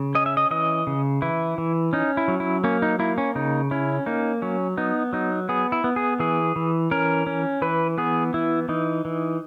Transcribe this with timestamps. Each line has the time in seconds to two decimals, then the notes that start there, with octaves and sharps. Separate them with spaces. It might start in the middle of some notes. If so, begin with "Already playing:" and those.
Already playing: C#3
0.15 C#4 D#5
0.26 E5
0.37 D#5
0.51 E3 D#5
0.87 C#3
1.22 E3 E4
1.58 E3
1.93 C#4 D#4
2.17 E4
2.28 F#3
2.40 E4
2.64 A#3 C#4
2.82 D#4
2.99 A#3 E4
3.18 C#4
3.35 C#3 D#4
3.71 C#4 E4
4.06 A#3 D#4
4.42 F#3 C#4
4.77 B3 D#4
5.13 F#3 D#4
5.49 B3 G#4
5.72 E4
5.84 B3
5.96 G#4
6.20 E3 G#4
6.56 E3
6.91 C#4 A#4
7.27 C#4
7.62 E3 B4
7.98 B3 G#4
8.34 E3 E4
8.69 E3 D#4
9.05 E3